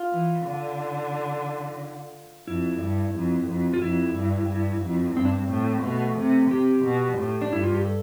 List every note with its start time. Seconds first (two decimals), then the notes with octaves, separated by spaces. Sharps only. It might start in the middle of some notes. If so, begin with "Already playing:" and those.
Already playing: F4
0.13 E3
0.46 D3
2.48 F2 E4
2.82 G2
3.15 F2
3.48 F2
3.74 F4
3.82 F2 E4
4.15 G2
4.49 G2
4.83 F2
5.16 G2 C4
5.25 D4
5.34 C4
5.50 A2
5.84 B2 A3
6.18 C3
6.51 C3 G4
6.85 B2
7.18 A2
7.42 D4
7.52 G2 E4
7.64 F4
7.75 G4
7.85 A4